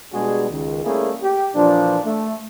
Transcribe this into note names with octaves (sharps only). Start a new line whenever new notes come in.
B2 G3 G#3 D4 F#4 G#4
C#2 D#3
G3 A3 A#3 C#4 E4 G#4
G4
A#2 E3 F3 D4
A3